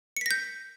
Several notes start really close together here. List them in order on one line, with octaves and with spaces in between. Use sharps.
C#7 B6 A#6 G6